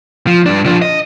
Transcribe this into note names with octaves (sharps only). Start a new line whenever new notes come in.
F3
G2 D4
F3 D4
D#5